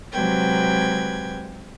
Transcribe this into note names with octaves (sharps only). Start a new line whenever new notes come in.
C3 F#3 G#3 B4 G5 G#6